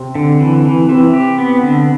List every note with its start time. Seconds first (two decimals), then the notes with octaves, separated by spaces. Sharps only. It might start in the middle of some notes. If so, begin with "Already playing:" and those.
Already playing: C3 C4
0.15 D3
0.41 E3
0.65 E3
0.89 C3 E3 C4
1.14 G4
1.38 B3
1.63 D3